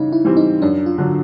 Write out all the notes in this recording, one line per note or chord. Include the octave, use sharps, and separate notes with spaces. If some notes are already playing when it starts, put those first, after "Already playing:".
Already playing: C#3 E3 G3 D#4
E4
E3 G3 C4
D#4
F#2 D4
F4
D3 F#3